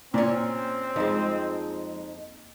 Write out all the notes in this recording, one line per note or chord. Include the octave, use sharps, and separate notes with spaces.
A#2 C4 C#4 D5
F2 F3 G#3 D#4